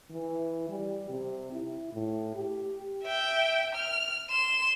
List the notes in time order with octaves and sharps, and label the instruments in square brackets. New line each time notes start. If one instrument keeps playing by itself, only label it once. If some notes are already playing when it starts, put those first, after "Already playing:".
[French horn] E3
G3
C3
E4
A2
G4
[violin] E5 G5
F6
C6 E7